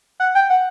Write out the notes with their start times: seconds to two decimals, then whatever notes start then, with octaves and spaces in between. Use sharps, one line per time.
0.20 F#5
0.35 G5
0.50 F#5